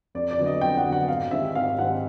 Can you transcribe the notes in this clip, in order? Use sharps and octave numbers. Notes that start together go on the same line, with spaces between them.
F2 D5
D5
D3 F#3 B3
D#5
F2 G5
F#5
D3 F#3 B3
F#5
G#1 F5
G#2 D#3 G3 C4 E5
G#1 F5
G#2 D#3 G3 C4 F#5